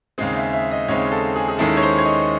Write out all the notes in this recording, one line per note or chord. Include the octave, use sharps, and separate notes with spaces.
D#2 C#3 G#3 C4 G#4
E5
E5
D#5
D#2 C#3 G#3 C4 C#5
A4
G#4
G#4
D#2 D#3 G#3 C#4 E4 A4
C#5
C5
C#5
D#5